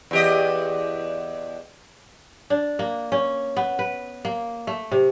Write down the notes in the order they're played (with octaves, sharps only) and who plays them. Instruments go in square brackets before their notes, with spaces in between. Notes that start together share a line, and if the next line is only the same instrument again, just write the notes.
[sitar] E2 G4 D#5
[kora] D4
A#3
C#4
B3
B4
A#3
A3
C3